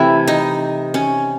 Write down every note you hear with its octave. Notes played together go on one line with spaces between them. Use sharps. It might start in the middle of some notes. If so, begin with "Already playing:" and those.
Already playing: C3 E3 A3 E4 A4
D#4
C#4